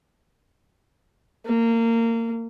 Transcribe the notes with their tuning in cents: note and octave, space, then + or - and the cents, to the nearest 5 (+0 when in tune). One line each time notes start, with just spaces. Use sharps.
A#3 -25